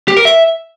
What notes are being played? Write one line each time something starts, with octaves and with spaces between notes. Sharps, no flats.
G4
A#4
E5